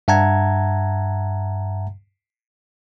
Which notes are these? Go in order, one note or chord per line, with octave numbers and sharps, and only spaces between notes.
G2 E5 F#5 A5 A#5 G#6